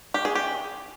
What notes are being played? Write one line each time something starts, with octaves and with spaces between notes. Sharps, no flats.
G4
G#4
G4